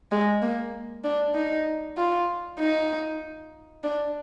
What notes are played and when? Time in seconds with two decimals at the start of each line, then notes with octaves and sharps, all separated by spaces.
0.12 G#3
0.42 A#3
1.04 D4
1.35 D#4
1.97 F4
2.59 D#4
3.84 D4